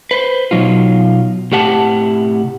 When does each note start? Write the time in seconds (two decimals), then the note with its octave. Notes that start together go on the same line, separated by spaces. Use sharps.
0.11 B4 C5
0.51 B2 F#3 D#4 F4
1.52 A2 C3 G4 F#5 A5